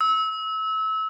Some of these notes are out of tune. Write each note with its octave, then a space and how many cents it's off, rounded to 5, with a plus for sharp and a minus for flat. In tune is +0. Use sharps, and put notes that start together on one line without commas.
E6 -30